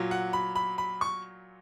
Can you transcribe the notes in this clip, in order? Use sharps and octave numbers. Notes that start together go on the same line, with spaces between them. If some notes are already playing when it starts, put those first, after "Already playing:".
Already playing: A#2 F#3
F#5
B5
B5
B5
C#6